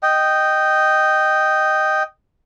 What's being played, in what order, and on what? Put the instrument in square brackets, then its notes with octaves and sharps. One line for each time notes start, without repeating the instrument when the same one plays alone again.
[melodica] D#5 G5